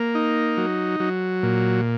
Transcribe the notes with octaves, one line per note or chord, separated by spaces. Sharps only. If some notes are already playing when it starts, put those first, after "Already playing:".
Already playing: A#3
D#4
F#3
F#3
A#2